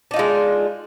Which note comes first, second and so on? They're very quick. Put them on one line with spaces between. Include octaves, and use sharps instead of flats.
D4 D#4 F4 G#3